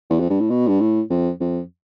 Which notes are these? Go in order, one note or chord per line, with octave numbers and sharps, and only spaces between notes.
E2
F2
G2
A2
B2
G2
A2
F2
F2